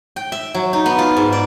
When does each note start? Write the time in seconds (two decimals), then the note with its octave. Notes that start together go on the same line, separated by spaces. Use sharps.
0.16 G5
0.32 E5
0.54 F#3
0.73 D#4
0.86 B3
0.99 F4
1.17 G#2
1.32 D5